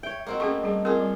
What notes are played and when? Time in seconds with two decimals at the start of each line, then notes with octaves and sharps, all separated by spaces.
0.03 C#5 E5 G5
0.26 A#3 C4 F#4 D#5
0.40 A3 A#3 C#4 G#4 C#6
0.63 G3 G#4
0.85 C4 F4 G#4 A#4
1.00 G3